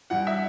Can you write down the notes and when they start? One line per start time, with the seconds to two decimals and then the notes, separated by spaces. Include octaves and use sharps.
0.10 G2 E3 F#5
0.27 E5